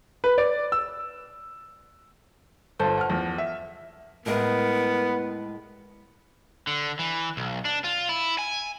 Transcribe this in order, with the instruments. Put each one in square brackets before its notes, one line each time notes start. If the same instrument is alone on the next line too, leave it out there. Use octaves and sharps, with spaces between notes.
[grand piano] B4
D5
E6
[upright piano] G1 F4 [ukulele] A4 C5
[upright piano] F#5 F6
E2 F3
E5
[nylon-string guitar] A2 G3 G#3 [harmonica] B3 [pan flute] A#4
[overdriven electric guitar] D3
E3
B1
D4
F4
E4
G#5